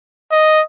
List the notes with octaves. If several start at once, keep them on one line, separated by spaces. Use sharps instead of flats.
D#5